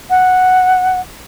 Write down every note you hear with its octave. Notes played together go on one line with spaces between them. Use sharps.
F#5